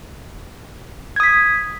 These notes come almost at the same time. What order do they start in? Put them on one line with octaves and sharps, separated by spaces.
G#6 D#6 B6